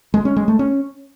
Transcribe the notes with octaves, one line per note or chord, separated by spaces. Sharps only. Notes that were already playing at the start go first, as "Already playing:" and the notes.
G#3
C#4
G#3
A3
C#4